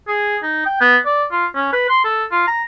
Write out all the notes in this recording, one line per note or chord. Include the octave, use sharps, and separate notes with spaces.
G#4
D#4
G5
B3
D5
F4
C#4
B4
C6
A4
F4
A#5